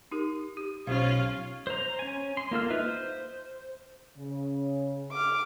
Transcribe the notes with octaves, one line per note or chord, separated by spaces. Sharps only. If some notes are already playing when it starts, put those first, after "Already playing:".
D#4 G4 A#4
G4
B1 C#4 F4 G4 C5 F5
C5 A#5
C#4 G#5
C6
A#3 F4 A4 F6
D#4 F4 B4 E5
C5
C#3
D6 F6